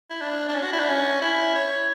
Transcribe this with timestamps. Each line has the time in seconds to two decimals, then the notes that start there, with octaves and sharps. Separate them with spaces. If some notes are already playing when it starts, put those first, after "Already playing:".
0.10 E4
0.21 D4
0.49 D4
0.54 C#4
0.63 F#4
0.72 E4
0.79 D4
0.88 C#4
1.21 E4
1.55 C#5